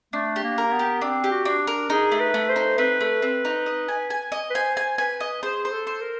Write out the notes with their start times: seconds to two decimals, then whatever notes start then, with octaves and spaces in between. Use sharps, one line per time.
0.13 A3 D4
0.36 G4
0.43 A#3
0.58 A#4
0.72 B3
0.79 G4
1.01 C4 D4
1.24 G4
1.31 F#4
1.45 D4
1.67 A#4
1.90 D#4 G#4
2.12 A3
2.19 B4
2.34 A3
2.49 C5
2.56 D#4
2.78 C4 B4
3.01 A3
3.22 C4
3.45 D#4
3.66 D#5
3.88 G#5
4.10 G#5
4.32 D#5
4.50 B4
4.55 C5 G#5
4.77 G#5
4.98 B4 G#5
5.20 D#5
5.43 G#4 C5
5.65 C5
5.71 A4
5.87 C5
6.01 A#4